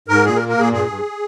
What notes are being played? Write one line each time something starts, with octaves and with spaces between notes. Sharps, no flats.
G#2 A#4
A#2 G#4
A#4
A#3
A#4
A#2 G#4
G2 G#4
G2